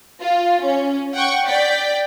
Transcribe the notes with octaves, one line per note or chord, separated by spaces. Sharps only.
F4
C#4
F#5 G5 C#6
D5 G5 B6